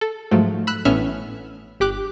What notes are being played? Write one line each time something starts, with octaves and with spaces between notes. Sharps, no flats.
A4
G#2 F3 F#3 A3
B5 E6 F#6
A1 A2 B3 C#4 E5 F6
G1 G4 D6 F#6